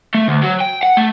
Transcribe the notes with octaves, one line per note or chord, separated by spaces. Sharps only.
A3
D2
F#3
G5
F#5
A3